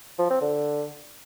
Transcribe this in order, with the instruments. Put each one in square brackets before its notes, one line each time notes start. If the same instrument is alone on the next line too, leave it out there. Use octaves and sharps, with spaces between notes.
[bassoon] F3
C4
D3